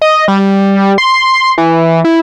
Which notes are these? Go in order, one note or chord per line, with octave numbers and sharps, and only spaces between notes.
D#5
G3
C6
E3
E4